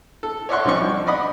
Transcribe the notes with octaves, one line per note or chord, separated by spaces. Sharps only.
A4
C#5 D5 E5 F#5 C6 C#6
C2 F3 C#4 D#4 D5 C#6
F3
D5 D#5 F#5 B5 D#6